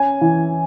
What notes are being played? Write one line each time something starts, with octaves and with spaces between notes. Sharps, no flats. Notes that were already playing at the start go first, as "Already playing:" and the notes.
Already playing: C#4 G#5
E3